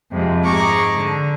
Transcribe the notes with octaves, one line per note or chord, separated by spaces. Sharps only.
F2 C3 G#3
G#2 G#4 A#5 C#6 D6
D3